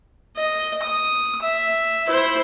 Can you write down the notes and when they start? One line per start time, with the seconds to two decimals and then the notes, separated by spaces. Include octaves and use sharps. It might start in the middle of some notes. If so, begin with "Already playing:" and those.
0.37 D#5
0.83 D#6
1.43 E5
2.07 E4 C5